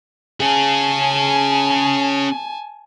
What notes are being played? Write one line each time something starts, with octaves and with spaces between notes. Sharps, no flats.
C#4 G#4 G#5 A5